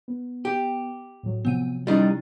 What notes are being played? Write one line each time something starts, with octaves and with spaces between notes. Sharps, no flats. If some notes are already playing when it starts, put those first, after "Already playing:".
B3
G4
A2 F#3
C3 F3 F#3 B3 F#5 D#7
G3 C#4 D#4 E4 A6